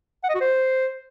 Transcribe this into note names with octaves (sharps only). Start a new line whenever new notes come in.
F#5
D#5
F#4
C5